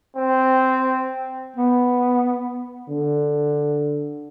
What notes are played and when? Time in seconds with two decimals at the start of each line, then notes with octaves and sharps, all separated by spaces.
0.16 C4
1.57 B3
2.89 D3